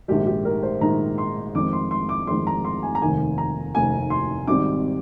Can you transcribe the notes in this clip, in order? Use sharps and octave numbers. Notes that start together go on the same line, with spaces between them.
A#1 G#2 D#3 G#3 G4
G4
A#4
C5
A#1 G#2 D#3 G#3 A#5
C6
F2 D#3 G#3 C4 D6
C6
C6
D6
F2 D#3 G#3 C4 C6
A#5
C6
G#5
A#5
F1 D#2 D#3 G#5
A#5
F1 D#2 D#3 G#5
C6
G#1 G#2 G3 C4 D6